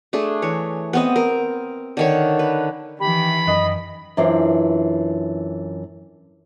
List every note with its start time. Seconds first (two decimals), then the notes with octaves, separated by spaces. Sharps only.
0.13 A3 D4 G#4
0.42 E3 C#5
0.93 B3 C4 D#5
1.16 A#4
1.97 D3 D#3 C#5
2.39 B4
3.00 D#3 E3 G4 B5
3.47 F#2 D#5
4.17 F#2 E3 D4 F4 B4 C5